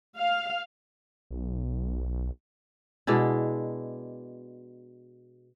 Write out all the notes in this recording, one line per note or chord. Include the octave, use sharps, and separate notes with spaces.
F5
B1
B2 G#3 D4 E4